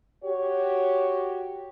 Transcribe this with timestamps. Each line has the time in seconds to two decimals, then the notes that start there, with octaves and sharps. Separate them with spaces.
0.24 F#4 G4 C#5